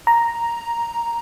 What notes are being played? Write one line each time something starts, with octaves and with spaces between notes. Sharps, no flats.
A#5